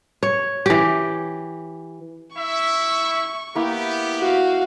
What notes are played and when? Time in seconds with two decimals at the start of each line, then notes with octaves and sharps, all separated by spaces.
0.23 C#5
0.66 E3 G4
2.36 E4 E5 C#6
3.55 A#3 B3 E4 G4
4.19 F#4 F5